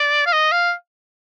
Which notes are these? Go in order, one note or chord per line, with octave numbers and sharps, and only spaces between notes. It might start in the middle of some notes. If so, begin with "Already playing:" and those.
Already playing: D5
F5
D#5
F5